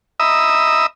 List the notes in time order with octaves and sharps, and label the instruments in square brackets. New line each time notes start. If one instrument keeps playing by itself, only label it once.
[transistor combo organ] D#5 E5 A#5 B5 D#6 E6